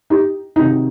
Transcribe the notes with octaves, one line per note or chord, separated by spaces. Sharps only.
D#4 G4
C3 D#3 F#3 D#4